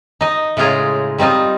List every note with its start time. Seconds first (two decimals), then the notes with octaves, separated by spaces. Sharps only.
0.21 D#4 D#5
0.57 A2 C#3 G#3 F4 G#4 A#5
1.18 G3 C4 D#4 F4 D#5